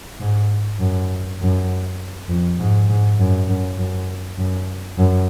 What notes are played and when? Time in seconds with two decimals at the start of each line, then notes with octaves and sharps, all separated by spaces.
0.20 G#2
0.80 F#2
1.40 F#2
2.29 F2
2.59 G#2
2.89 G#2
3.19 F#2
3.49 F#2
3.78 F#2
4.38 F#2
4.98 F#2